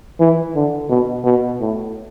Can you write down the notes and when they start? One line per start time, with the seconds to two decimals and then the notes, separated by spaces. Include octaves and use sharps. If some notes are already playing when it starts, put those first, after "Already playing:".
0.20 E3
0.56 D3
0.89 B2
1.24 B2
1.60 A2